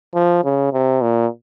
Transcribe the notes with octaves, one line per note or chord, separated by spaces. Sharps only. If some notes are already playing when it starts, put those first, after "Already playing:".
F3
C#3
C3
A#2